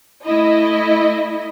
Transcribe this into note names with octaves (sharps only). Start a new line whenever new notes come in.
A3 E4 D#5